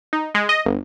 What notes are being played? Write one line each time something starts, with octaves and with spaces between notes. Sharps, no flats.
D#4
G#3
D#5
G1